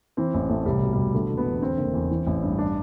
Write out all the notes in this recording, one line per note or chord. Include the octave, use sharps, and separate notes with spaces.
E3 C4
A1
A2 A3
C2 G3
B2
B2 G3
D3 A3
E1
B3
E2
D3 C4
F#1
E2
E3
A1
G2
D4